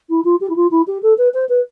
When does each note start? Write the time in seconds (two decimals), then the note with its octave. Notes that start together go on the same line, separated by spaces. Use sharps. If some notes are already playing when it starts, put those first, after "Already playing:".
0.10 E4
0.25 F4
0.41 G4
0.50 E4
0.56 F4
0.71 E4
0.87 G4
1.03 A4
1.18 B4
1.34 C5
1.49 B4